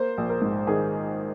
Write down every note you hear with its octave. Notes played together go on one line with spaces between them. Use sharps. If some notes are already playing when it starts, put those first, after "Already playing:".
Already playing: A#3 C5
A#1
A#4
G#2
D#3 G#4